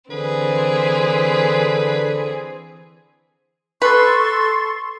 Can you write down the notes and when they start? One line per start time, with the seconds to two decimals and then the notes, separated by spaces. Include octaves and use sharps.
0.11 D3 E3 C4 G#4 B4
3.82 A4 B4 C6 C#6